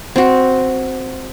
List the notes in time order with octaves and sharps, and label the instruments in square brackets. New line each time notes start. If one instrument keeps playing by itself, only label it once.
[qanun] C4 F#4